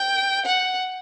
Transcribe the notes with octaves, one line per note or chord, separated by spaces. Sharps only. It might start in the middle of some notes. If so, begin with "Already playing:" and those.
Already playing: G5
F#5